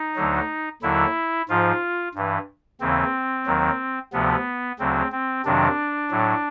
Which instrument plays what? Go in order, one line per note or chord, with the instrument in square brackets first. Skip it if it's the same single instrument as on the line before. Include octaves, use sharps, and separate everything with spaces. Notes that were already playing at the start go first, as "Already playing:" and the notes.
Already playing: [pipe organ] D#4
D2 D3 F#3
D#2 D3 F#3 E4
G#2 F3 F4
G2 E3
D#2 C#3 E3 C4
D#2 D#3 F#3
D2 C3 F3 B3
D2 C#3 F#3 C4
C4
F2 C3 D#3 F#3 D4
A2 F#3